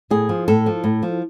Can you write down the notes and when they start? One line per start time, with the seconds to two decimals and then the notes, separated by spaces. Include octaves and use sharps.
0.11 A2 G#4
0.29 F3
0.48 A2 A4
0.66 F3
0.84 A2
1.03 F3